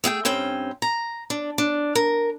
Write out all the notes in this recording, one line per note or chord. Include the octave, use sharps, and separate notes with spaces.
A3 G#4 F#5 G5
G2 C4 C#4 G5
A#5
D4
D4
A#4